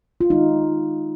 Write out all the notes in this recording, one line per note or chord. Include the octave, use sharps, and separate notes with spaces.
F4
D#3 G#3 D#4